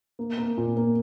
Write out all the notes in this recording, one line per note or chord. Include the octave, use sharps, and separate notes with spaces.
A#3
A#3
A#2
A#3